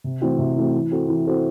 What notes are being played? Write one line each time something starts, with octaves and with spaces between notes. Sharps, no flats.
C3
E3 A3 C4 F#4
C3
E3 A3 C4 F#4
E3
C4 F#4 A4 C5
E3
C4 F#4 A4 C5